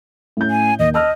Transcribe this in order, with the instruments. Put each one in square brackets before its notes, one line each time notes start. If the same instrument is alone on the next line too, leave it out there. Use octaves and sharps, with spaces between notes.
[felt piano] A2 C#4 G6
[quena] G#5
[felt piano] D#2 [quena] D#5
[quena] D#5 [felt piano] A5 E6 F6